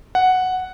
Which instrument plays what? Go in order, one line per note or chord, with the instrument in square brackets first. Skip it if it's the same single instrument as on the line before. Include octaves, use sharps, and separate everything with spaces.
[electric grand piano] F#5